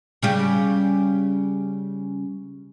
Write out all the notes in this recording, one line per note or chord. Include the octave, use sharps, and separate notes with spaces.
C#3 G3 G4